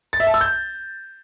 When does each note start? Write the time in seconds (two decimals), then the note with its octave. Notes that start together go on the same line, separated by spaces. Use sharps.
0.13 A6
0.20 E5
0.27 A5
0.34 E6
0.41 G6